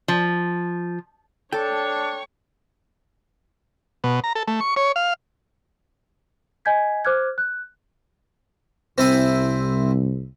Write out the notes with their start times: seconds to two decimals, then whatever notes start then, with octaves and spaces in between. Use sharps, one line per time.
0.08 F3
1.52 D4 A4 C#5 G5 A5 C#6
4.04 B2
4.24 A#5
4.35 A4
4.48 A3
4.61 C#6
4.76 C#5
4.96 F5
6.65 D#5 G#5 G6 G#6 B6
7.05 C5 D6 F6 F#6 G#6
7.38 F#6
8.98 C2 C4 E4 G#5